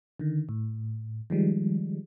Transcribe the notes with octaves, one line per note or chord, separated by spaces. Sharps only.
D3 D#3
A2
D#3 F3 G3 G#3